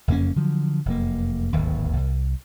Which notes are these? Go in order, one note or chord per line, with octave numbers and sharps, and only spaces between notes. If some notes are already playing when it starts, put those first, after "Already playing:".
F#1 F2 A#3 C#4
D3 F3 F#3
F1 F#2 A#3
D1 G#1 D#2
C2